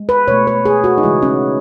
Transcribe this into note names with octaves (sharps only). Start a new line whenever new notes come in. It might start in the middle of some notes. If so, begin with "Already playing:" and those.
Already playing: G#3
B4
B2 A3 C#5
B4
G#4
F#4
D#4
C#3 E3 G#3 E4
C#4